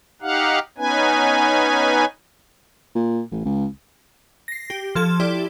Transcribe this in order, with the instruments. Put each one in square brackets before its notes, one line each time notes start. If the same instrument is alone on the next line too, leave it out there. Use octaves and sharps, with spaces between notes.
[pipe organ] D#4 G4 F5 F#5
B3 C#4 D#4 B4 G#5
[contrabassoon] A#2
A1
C#2
[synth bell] A#6 C7
G4
F3 A4 G#6
E4 G4 D5